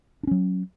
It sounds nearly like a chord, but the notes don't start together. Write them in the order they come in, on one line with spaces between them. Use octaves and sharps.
D4 C#4 F#3